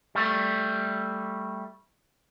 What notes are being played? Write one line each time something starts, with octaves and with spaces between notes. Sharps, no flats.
G3 A3